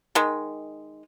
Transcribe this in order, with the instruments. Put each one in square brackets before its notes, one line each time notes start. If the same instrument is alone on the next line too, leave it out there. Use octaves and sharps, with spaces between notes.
[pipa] D#3 G#3